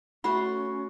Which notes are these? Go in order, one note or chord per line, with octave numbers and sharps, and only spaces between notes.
A3 C#4 F#4 B5 C6